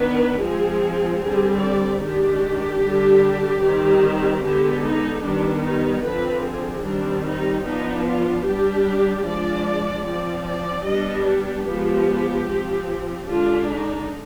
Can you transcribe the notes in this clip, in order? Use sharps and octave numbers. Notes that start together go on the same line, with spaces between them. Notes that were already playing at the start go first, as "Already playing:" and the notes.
Already playing: D#3 B3 D4 B4
F3 G#3 C4 G#4
D3 G3 C4 G#4
D5
D#3 G#3 D4 G4
D3 G3 D4
D#3 G3 C4
D3 G#3 B3 G4
D#4
D#3 G3 B3 D4
D#4
D3 F3 C4 B4
G#4
D#3 G3 C4 D4
D#4
F3 B3 D4 D#4
F4
G3 D4 G4
F3 G#3 D4 D5
F3 C4 D5
D5
G3 B3 D4 D#5
G4
F3 G#3 B3
F3 C4
D3 G#3 D4 F4
D#4